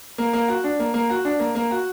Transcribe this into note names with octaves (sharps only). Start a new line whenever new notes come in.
A#3
A#3
F#4
D4
A#3
A#3
F#4
D4
A#3
A#3
F#4